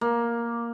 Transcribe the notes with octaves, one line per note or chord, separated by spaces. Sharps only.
A#3